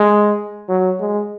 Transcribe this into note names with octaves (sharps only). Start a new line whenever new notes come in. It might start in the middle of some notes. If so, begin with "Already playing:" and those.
Already playing: G#3
F#3
G#3